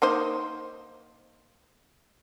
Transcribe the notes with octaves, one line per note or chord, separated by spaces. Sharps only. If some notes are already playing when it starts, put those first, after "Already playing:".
A#3 D#4 C5